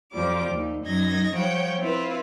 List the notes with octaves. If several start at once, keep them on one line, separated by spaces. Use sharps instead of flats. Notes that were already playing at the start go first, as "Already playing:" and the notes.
F2 F3 G3 D6
D#2 D#4
F#2 D#4 D#5 G#6 A#6
F3 G3 C#5 F#5 G5
C4 E4 F4 B4